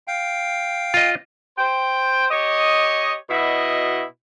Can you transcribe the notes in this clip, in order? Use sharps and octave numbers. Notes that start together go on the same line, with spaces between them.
F5 G5
F4 D#5
C5 G5
G4 C#5 D#5
B2 E4 F#4 D#5